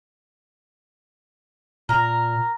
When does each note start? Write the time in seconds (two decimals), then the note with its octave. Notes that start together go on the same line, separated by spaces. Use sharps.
1.89 A#2 A#4 A#5